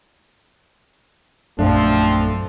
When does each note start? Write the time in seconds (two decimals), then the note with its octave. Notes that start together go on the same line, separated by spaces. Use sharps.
1.59 A#1 F#2 F3 A3 C4 D4